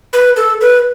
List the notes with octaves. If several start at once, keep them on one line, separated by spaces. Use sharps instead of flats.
B4
A4
B4